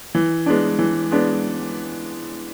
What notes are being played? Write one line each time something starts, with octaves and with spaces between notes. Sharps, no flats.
E3
G#3 B3 D4
E3
G#3 B3 D4